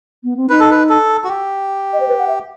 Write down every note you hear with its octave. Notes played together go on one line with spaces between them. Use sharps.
B3
C4
D#4 B4
A4
B4
A4
F#4
G4
D#5
C5
B4
F#5
E5